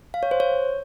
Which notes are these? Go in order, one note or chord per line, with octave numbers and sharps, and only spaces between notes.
F5
C#5
C5
C#5